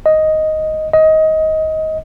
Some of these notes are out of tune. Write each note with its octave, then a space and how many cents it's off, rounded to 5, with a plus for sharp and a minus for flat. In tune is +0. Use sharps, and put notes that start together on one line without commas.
D#5 +5
D#5 +20